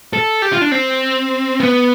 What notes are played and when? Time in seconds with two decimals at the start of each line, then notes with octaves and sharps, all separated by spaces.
0.13 A4
0.42 G4
0.53 F4
0.61 D4
0.72 C4
1.60 B3